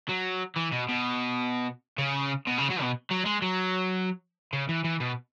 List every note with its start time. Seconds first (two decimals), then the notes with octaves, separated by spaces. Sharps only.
0.09 F#3
0.56 E3
0.72 B2
0.89 B2
1.98 C#3
2.47 B2
2.58 C#3
2.70 F#3
2.82 B2
3.11 F#3
3.25 G#3
3.42 F#3
4.53 C#3
4.69 E3
4.84 E3
5.00 B2